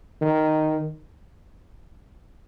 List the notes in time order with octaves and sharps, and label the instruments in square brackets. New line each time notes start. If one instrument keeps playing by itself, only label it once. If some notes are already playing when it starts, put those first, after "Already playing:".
[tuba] D#3